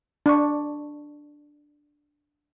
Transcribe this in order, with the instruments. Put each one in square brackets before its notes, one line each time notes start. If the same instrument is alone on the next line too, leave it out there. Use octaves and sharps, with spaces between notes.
[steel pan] D4 C#6